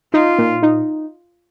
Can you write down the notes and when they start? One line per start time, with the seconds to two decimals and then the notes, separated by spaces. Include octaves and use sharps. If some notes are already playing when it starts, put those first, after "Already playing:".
0.14 D#4 F4
0.38 A#2
0.63 D#4